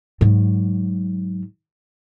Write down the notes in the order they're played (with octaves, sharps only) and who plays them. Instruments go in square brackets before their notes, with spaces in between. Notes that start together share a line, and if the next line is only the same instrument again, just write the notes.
[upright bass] G#2 F#3